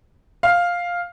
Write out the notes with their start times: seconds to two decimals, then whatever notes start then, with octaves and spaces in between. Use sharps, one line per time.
0.43 F5